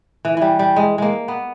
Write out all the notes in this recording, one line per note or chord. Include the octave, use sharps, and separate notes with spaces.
E3
E3 G3
G3
G#3
G#3 A#3
B3